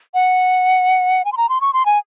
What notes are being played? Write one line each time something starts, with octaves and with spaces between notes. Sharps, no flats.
F#5
G#5
C6
A#5
C6
C#6
C6
G#5